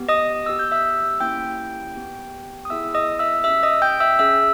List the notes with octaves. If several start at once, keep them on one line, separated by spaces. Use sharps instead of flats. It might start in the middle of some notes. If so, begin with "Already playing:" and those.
Already playing: B3 G4
D#5 D#6
B3 G4 E6
G6
E5 E6
A#3 C#4 E4 G4 G5 G6
B3 G4
D#6
B3 E4 G#4 E5 E6
D#5 D#6
E5 E6
C#4 G4 E5 E6
D#5 D#6
G5 G6
E5 E6
C#4 G#4 E5 E6